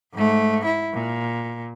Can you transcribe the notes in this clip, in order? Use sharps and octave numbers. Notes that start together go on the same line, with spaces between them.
G#2 A3
E4
A#2